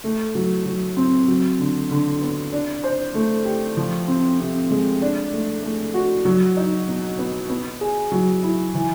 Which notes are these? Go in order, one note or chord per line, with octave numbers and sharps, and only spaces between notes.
A3
F#3
F#3
C4
F#3
D3
D3
B3
D4
C5
A3
G4
F3
C4
C3
G#3
D4
A3
A3
F#4
F#3
D#4
B2
B3
B3
G#4
F#3
E4
E3